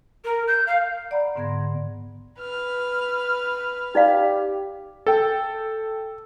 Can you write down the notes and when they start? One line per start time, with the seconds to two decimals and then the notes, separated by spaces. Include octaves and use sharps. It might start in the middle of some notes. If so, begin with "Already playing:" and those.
0.25 A#4
0.47 G6
0.67 F5
1.11 D5 F#5 A#5 B5
1.36 G#2 D3 B3 C6 G#6 A#6
2.40 B4 F6
3.95 D#4 G4 D5 F5
5.06 A4 G5